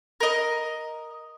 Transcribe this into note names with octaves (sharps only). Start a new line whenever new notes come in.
A#4 D#5